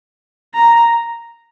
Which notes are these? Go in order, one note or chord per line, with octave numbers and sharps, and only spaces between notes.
A#5